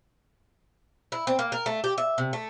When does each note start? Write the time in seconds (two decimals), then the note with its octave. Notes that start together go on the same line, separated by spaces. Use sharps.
1.12 E4
1.27 C4
1.39 A#3
1.52 A#4
1.66 A3
1.84 G4
1.98 E5
2.18 C3
2.33 A3